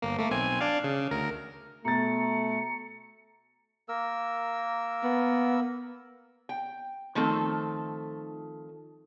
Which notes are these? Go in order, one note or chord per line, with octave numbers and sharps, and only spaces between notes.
G1 A#3
A3 A#3
B1 C4 G#5
D4 D5 F5
C#3
D2 A#4
B2 A3 A#5 A6 C#7
A#3 A#4 E6
B3
G5
D#3 F3 A3 C4 A4